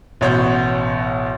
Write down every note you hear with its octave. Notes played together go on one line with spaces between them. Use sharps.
A1 B2 C#5 F#5 C6 G6